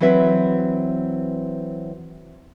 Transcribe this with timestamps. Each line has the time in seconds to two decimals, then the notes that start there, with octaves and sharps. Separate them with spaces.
0.01 E3 F#3 C4 B4 E5